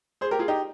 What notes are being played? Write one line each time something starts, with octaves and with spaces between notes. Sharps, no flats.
G#4 C5
G4 A#4
F4 G#4
D#4 G4